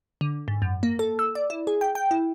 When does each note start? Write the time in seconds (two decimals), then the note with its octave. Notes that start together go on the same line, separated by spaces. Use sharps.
0.21 D3
0.48 G#2
0.62 F#2
0.83 A#3
0.99 A4
1.19 E6
1.35 D5
1.50 E4
1.67 G#4
1.81 G5
1.95 G5
2.11 E4